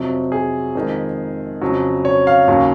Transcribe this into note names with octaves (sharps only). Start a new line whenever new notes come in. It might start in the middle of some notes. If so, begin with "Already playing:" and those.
Already playing: F2 C3 F#3
G#4
F2 D#3 G#3
F2 C#3 F#3
C#5
F5
D#2 C#3 F#3